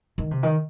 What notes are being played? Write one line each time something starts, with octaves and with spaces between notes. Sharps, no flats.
D#3
C3
D#3